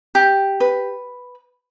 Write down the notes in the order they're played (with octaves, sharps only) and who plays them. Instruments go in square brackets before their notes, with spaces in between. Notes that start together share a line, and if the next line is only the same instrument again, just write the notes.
[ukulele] G4
B4